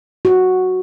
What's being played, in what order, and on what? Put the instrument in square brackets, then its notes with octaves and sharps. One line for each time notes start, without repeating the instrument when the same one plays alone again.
[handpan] F#4